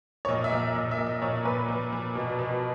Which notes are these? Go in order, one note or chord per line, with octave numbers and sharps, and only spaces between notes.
C#5
A#2 D#5
E5
A#2
E5
A#2 D#5
E5
A#2
D#5
A#2 C#5
A#2 B4
A#2
A#2
B2
B2